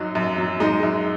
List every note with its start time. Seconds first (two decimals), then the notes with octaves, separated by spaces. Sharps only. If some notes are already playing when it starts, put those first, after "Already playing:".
Already playing: F#2 F#3 D#4
0.15 F#2
0.38 F#3
0.60 G#3 D#4
0.83 F#2